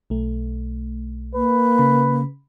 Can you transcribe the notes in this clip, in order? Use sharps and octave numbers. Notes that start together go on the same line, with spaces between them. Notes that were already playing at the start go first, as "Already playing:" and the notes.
B1 A3
A#3 B4
C#3 B5